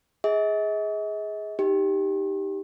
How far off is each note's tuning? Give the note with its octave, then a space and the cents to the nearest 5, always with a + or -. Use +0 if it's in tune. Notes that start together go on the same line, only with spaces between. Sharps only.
G#4 +0 D#5 +45
D#4 +0 G4 +0